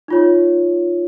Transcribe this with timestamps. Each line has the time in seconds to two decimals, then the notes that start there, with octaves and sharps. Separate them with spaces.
0.08 D#4 F4 C#5